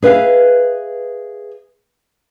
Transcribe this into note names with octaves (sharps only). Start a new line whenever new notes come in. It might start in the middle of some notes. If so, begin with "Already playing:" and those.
G#4 B4 E5 F5